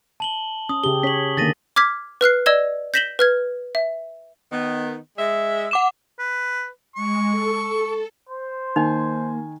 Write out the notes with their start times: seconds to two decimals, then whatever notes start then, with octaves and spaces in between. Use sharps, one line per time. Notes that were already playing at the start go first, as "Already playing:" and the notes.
0.20 A5 F#7 G7
0.69 C#4 D#6
0.84 C#3 G4 G#4 G7
1.03 C#4 C#5 B6 F#7
1.37 D3 D#3 A#3 A6 A#6 D#7
1.76 D6 F6 G#6 B6
2.21 B4 F6 F#6 C7
2.46 D5 D#5 E6 G#6 E7 G7
2.94 G6 A#6 B6 E7 F#7 G7
3.19 B4 F6 G#6
3.75 E5
4.52 D#3 B3
5.18 G#3 E5
5.71 F#5 D6 E7
6.19 B4
6.96 G#3 C#6
7.31 A4
8.29 C5
8.76 D#3 A#3 D#4 G#5